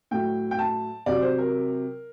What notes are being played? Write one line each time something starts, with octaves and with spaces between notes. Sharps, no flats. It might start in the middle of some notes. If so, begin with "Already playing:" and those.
A2 F#3 G5
G5
A5
C3 F#3 D5
C5
A#4